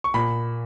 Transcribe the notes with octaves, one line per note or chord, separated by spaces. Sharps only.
C#6
A#2 B5